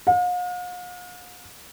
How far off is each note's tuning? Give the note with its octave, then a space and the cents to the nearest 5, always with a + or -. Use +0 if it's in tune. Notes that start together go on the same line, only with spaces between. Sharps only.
F5 +45